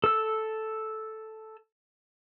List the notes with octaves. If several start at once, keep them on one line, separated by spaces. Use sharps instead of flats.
A4 E6